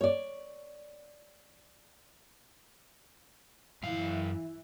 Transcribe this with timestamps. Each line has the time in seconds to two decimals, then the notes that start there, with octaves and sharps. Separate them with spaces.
0.01 C#5 D5
3.83 F#2 E3 F5